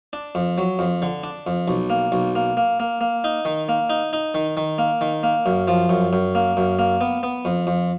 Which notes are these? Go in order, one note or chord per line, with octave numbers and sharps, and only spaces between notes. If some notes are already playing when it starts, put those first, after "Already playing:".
D4
F2
F#3
F2
D3
D4
F2
B1
A#3
B1
A#3
A#3
A#3
A#3
D#4
D#3
A#3
D#4
D#4
D#3
D#3
A#3
D#3
A#3
F#2
F3
F#2
F#2
A#3
F#2
A#3
B3
B3
F2
F2